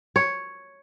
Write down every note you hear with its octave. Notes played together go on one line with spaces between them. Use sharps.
C#5